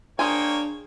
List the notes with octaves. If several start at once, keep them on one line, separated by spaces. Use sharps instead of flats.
A#3 D4 G#4 C5 C#5 G5 G#5